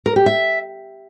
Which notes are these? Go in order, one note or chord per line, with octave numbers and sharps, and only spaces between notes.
A#4
G4
E5